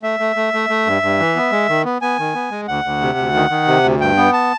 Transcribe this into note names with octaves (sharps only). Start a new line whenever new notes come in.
A3 E5
A3
A3
A3
A3
G2
G2
E3
B3
G#3
D#3
B3
B3 G#5
D#3
B3
G#3
D2 F#5
D2
C3
D2
D#3
D#3
C3
D2
G2 G5
B3
A5